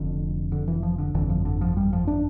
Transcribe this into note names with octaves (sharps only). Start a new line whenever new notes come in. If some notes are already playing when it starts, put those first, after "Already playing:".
Already playing: F1 F2 D3 F3
D3
E3
F3
D3
G1 F2 D3 E3
F3
D3
F3
G3
F3
D4